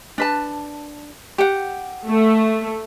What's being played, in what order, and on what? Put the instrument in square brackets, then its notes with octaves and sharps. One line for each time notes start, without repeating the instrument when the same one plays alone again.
[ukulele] D4 B4 A5
G4 F#5
[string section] A3